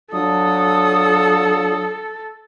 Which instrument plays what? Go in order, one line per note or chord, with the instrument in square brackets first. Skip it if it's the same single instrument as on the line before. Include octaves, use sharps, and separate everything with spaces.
[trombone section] F#3 D4 F4 [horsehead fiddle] A4 [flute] D#6